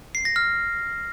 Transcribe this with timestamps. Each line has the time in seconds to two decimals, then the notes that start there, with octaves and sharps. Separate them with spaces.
0.15 C7
0.25 A#6
0.36 F6